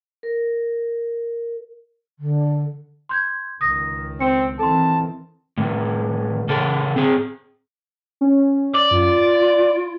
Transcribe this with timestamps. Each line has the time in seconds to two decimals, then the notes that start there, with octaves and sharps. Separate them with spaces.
0.23 A#4
2.18 D3
3.09 C6 G6 G#6
3.61 C#2 D#3 D#6 A#6
4.21 C4 C#7
4.59 D#3 E3 C4 A4 A5 C6
5.58 A2 D#3
6.49 C#3 A4 A#4
6.96 C4 G#4
8.21 C#4
8.74 D5
8.91 F#2 F4
9.18 D7